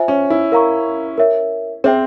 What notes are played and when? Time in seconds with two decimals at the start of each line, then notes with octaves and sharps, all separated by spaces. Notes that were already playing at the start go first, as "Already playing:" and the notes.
Already playing: F4 C5 E5 G#5
0.08 C#4
0.30 E4
0.52 A#4 F5 A#5 C#6
1.18 A#4 C#5 E5
1.84 C4 G#4 C5 E5 G5